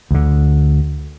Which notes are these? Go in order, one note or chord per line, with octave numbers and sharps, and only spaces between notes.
D2 D3